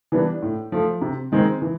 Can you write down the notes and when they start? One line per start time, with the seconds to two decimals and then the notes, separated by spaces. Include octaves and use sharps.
0.12 E3 G3 B3 D4
0.42 A2
0.72 F3 A3
1.01 C3
1.32 D#3 G#3 C4 D#4
1.62 E3